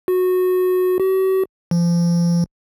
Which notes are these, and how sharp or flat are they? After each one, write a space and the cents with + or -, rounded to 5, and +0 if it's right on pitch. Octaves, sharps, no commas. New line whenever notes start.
F#4 -15
F#4 +45
F3 -30